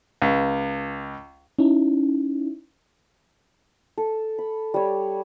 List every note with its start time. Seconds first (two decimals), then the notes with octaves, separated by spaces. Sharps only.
0.22 C#2
1.59 C#4 D#4 E4
3.98 A4
4.38 B5
4.74 G3 C#5